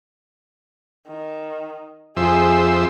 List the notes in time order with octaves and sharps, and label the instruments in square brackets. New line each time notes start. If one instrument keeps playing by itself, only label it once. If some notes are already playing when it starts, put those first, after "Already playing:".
[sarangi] D#3
[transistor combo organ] F2 C5 E5 [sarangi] G#4